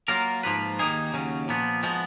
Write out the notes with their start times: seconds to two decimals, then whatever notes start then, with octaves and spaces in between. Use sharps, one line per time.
0.08 F#3 A#3 F4 A#4
0.43 G#2 F3 A#3 F4 B4
0.79 D#2 D#3 A#3 D#4 G#4
1.13 D#2 C#3 F#3 C#4
1.48 A#2 F3 B3
1.83 F3 G#3 B3 F#4